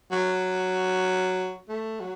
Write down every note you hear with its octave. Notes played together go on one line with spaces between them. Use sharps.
F#3
A3
F#3